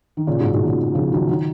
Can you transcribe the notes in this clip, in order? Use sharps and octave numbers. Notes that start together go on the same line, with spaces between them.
D#3
A#2 C#3
G#2 B2
G#2 B2
A#2 C#3
C#3 F3
D#3 F#3
D#3 F#3